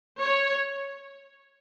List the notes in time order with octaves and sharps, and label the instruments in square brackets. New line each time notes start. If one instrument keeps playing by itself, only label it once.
[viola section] C#5